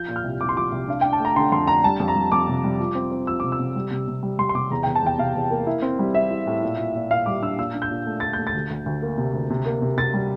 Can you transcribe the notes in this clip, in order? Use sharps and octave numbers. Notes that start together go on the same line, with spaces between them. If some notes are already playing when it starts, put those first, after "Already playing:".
Already playing: F3 G6
A#2
F6
C2
C2 D6
C6
F3 D6
C2
D4 F5
D4 G5
A5
A3
A#5
D3 C6
F2 C6
D4 A#5
G3 A5
F2
A#5
G3
F2 D6
C3
G3
F3
C4
C4
F3 E6
C3 D6
E6
C3
G3
C3
C3
G3
G3 C6
C6
C3 D6
E2 A#5
G5
E2
A5
E2 G5
C3 F5
E2
A#3
E4
C4
G3
C4 E5
E4
A2
A#2
A#2
A#2
A#2 F5
G3 D6
D4 E6
A#2 E6
D4
G6
A#2
A3
A3 A6
A3 G6
A6
D2
D2
D2
A#3
C3
D2
C3
A#3
C3
C3 A6
G3